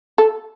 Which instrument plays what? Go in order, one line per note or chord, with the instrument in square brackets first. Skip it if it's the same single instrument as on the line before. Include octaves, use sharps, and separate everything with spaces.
[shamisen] A4